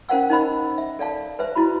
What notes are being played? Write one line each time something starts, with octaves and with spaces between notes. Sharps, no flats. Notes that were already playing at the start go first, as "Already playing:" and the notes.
C#4 A#4 C5 F5 F#5 E6
D#4 A#4 C5 D#5 B5 E6
E5
A4 D5 F5 A5
B4 C5 E5
E4 F#4 B5